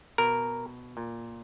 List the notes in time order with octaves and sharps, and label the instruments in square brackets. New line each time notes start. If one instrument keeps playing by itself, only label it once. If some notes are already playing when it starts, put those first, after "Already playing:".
[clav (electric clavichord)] B2 A#4
A#2